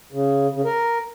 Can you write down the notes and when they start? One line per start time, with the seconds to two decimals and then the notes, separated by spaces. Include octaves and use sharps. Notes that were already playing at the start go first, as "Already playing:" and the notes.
0.12 C#3
0.53 C#3
0.65 A#4